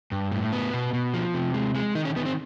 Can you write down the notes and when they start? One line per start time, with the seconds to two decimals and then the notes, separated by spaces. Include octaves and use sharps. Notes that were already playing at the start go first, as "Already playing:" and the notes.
0.12 G2
0.32 A2
0.53 B3
0.73 B2
0.93 B2
1.14 F3
1.34 C3
1.54 G#3
1.75 G#3
1.95 D#3 D#4
2.05 C#4
2.16 D#3 B3
2.26 C4